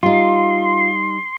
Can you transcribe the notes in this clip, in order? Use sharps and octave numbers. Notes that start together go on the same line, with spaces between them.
G3 D#4 F4 C6